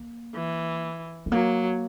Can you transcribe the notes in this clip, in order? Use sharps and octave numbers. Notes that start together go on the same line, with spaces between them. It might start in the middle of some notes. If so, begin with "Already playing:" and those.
Already playing: A#3
E3
G#3
F#3 A#3